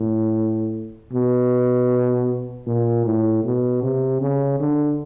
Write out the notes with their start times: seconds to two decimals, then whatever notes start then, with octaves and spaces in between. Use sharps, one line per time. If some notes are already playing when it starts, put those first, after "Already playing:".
Already playing: A2
1.12 B2
2.66 A#2
3.05 A2
3.44 B2
3.82 C3
4.21 C#3
4.60 D3